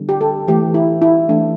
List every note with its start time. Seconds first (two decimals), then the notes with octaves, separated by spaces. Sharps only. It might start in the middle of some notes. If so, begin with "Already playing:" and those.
Already playing: D3 G3 B3
0.09 G4
0.21 A4
0.48 E3 A3 G4
0.74 E4
1.02 E4
1.29 E3 A3 D4